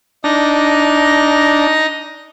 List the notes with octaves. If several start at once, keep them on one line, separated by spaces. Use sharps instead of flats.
D4 D#4 A#6